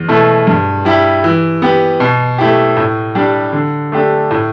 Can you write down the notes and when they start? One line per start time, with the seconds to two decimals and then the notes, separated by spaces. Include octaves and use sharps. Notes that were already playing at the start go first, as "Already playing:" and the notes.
Already playing: E2
0.08 B2 A3 E4
0.47 G2
0.85 G3 E4 G4
1.24 E3
1.62 B3 G4
2.00 B2
2.38 A3 E4 G4
2.77 A2
3.15 G3 D4 G4
3.53 D3
3.92 A3 D4 G4
4.31 A2